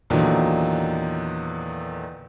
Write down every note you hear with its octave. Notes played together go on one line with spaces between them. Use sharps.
E2 A#2 D3 D#3 F#3